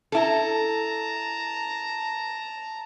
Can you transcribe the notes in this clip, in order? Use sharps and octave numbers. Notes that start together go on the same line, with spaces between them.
E4 A4 A5 A#5